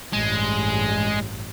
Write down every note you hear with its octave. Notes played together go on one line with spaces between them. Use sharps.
A1 G2 G#3